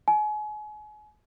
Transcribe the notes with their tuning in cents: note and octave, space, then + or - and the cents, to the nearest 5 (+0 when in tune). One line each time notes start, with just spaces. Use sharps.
G#5 +35